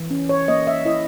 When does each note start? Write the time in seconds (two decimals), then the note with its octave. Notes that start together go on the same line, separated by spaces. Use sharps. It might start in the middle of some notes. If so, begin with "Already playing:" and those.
Already playing: E3
0.10 C#4
0.29 C#5
0.48 A#3 D#5
0.67 E5
0.85 E4 D#5